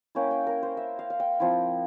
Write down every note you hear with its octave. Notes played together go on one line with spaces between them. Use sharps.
A#3 C#4 E4 G5
G5
A#4
C5
E5
F5
F5
G5
F3 C4 E4